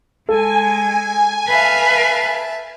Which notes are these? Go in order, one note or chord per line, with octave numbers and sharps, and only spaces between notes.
G#3 A4 G#5
B4 E5 F5 A5